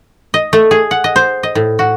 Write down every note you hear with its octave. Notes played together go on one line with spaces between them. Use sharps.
D#5
A3
G#4
F#5
D#5
C5
D#5
A2
F#4